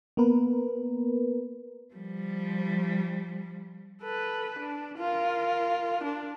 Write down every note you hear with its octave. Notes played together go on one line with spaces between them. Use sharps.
A#3 B3 A#4 B4
F3 G3
A4 B4
D4
F4 A#4
D4